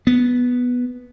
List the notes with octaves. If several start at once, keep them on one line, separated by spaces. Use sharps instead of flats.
B3